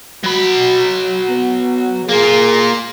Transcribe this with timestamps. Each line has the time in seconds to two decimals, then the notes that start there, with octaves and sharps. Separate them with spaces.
0.24 F#3 F#4 B5
1.29 B3
2.09 A#3 F4 G#4